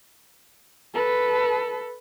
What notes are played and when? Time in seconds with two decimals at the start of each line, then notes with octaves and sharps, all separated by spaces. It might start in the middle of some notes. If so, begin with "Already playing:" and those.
0.94 A4 B4